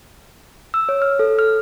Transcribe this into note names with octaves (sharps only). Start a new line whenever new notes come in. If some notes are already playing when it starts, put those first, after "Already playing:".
E6
C#5
F6
A4
F6